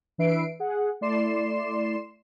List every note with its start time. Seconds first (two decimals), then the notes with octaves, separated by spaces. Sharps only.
0.18 E3 D4 B4 E5 C7 D7
0.60 G#4 F#5
1.01 A3 E4 D5 C6 C7 E7